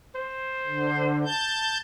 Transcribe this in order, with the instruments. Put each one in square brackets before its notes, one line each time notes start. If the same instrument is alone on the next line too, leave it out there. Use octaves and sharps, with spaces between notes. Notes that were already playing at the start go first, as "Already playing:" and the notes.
[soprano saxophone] C5
[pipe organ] D3
A5 G6